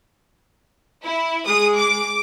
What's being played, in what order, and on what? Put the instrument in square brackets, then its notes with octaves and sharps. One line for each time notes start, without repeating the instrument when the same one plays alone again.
[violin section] E4
[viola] G#3 G#4 [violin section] D#6
[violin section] D6